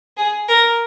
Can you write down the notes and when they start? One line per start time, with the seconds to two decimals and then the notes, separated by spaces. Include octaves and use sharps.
0.17 G#4
0.48 A#4